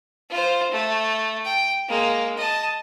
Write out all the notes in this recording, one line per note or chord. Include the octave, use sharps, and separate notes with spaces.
F4 C5
A3
G5
G#3 A#3
D#5 A5